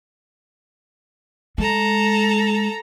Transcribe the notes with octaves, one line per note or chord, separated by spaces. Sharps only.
G#3 A4 A#5